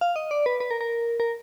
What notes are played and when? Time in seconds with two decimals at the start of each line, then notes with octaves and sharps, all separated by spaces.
0.01 F5
0.16 D#5
0.31 D5
0.46 B4
0.60 B4
0.71 A#4
0.81 A#4
1.20 A#4